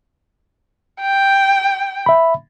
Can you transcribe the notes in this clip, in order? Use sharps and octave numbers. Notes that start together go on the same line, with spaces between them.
G5
E5 B5